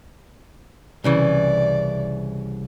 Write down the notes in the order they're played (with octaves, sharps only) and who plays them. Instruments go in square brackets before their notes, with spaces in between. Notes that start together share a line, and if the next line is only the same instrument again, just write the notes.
[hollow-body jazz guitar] C2 C#3 E3 [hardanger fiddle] D5